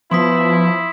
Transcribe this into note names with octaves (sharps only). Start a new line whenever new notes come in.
F3 B3 E4 C6 D#6 B6